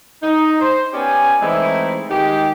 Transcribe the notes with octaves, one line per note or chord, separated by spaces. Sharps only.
D#4
C5
B3 C#4 G4 D5 G#5
E3 G#3 A3 C4 D#4 E4
D#3 G#3 D#4 G4